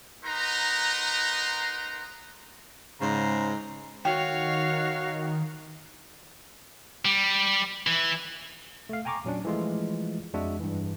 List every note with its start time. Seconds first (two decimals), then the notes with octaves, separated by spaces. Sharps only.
0.24 D#4 A#4 B4 F#5 A#5 C6
3.01 G#2 C#3 C5 A#5
4.05 D#3 F#4 C#5 F5 G5
7.05 G3
7.87 E3
8.89 A3 F5
9.05 G5 G#5 A#5 C#6 D6
9.24 A#2 F#3 C#4 D4
9.45 E3 F3 G#3 A3 F4
10.34 F2 G#3 D4 F#4 E5
10.60 G2 E3